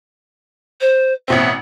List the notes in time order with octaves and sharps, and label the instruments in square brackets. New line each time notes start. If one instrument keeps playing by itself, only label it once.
[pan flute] C5
[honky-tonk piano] A1 B2 C4 [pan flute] E5